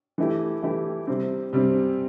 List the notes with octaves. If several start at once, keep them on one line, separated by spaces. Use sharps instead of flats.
E3 A3 E4 G4
E3 A3 E4 G4
C3 G3 C4
C3 G3 C4